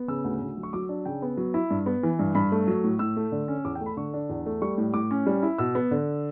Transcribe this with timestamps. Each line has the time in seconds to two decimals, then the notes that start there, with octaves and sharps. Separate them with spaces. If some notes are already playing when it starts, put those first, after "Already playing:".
Already playing: B3
0.08 C#3 E6
0.24 D2
0.41 D2
0.57 F#3
0.63 C#6
0.73 F#3 D6
0.89 D4
1.05 C#3 G5
1.22 B3
1.37 F#3
1.54 E4
1.71 G2
1.86 B3
2.03 E3
2.19 G2
2.35 G2 B5
2.52 A3
2.67 F#3
2.84 A2
2.99 A2 E6
3.17 A3
3.32 D3
3.48 C#4
3.65 E2 D6
3.75 G5
3.81 A3
3.86 B5
3.97 D3 C#6
4.14 D4
4.29 E2
4.46 A3
4.62 G3 C#6
4.78 A2
4.94 A2 D6
5.11 C#4
5.26 G3
5.43 E4
5.58 B2 E6
5.75 B3
5.91 D3